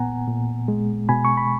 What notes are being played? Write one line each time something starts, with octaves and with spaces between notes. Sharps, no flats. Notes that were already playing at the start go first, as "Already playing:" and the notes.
Already playing: A#2 B3 F#5 G#5 A#5
A#2
G#3
B2 G#5 B5
C#6
B5